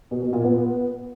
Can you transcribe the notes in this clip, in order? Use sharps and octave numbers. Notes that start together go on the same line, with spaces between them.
B2
B2
A#2
B3